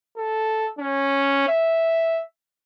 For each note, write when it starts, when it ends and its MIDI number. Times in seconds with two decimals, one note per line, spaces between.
0.17 0.69 69
0.79 1.47 61
1.48 2.23 76